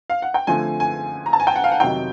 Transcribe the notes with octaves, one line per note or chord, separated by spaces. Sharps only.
F5
F#5
G5
D3 F3 A3 C4 G#5
G#5
A#5
A5
G#5
G5
F#5
F5
F#5
F2 C3 D#3 F#3 G5